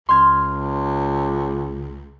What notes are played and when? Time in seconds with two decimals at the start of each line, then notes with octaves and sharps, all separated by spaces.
0.09 C#2 C6 F6 G#6